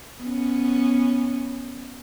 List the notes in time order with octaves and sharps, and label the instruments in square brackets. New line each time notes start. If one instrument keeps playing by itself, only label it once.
[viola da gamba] B3 C#4